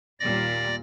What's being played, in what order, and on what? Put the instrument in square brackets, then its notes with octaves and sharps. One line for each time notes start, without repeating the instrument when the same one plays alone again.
[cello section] D#2 A#2 G3 [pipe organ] D5 A#6